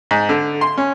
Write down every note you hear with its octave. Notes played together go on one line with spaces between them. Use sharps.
G#2
D3
C6
C#4